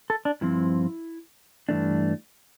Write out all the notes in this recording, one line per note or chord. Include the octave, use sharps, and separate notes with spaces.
A4
D4
G2 F3 C4 E4
G2 E3 A3 D4